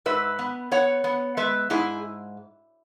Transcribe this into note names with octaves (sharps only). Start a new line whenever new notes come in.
G#2 B4 E5
B3
B3 C#5 F#5
B3
G#3 B4 E5
G#2 E4 G#4